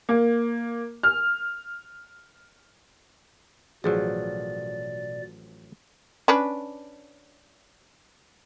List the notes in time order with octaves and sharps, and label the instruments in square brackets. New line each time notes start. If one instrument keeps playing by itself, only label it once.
[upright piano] A#3
F6
[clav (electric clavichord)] A1 F3 F#3 [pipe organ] B2 D5 [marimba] G#4
[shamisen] C#4 D4 B4